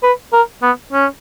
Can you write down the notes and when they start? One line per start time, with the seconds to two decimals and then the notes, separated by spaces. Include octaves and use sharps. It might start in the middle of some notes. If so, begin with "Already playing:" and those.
0.03 B4
0.33 A#4
0.62 B3
0.93 C#4